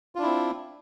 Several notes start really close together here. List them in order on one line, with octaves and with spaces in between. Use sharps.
F4 D4 E4 C4